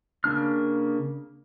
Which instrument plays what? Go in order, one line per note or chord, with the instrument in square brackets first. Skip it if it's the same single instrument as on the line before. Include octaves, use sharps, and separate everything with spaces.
[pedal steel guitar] C#3 A#3 D4 F6